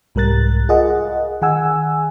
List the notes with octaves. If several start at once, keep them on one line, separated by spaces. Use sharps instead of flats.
C2 G#2 G3 A#4 F#6 A6
F4 G#4 A#4 D#5 F#5
D#3 G#4 F#5 G#5 E6